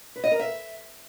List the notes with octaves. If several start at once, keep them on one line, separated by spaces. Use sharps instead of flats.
B4
D#5
A#4
E5